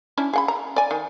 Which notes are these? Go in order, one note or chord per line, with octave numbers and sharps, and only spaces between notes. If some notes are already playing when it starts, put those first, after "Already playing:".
C#4 D4 E4
G#4 F#5 B5
A#5
D5 G#5
D#3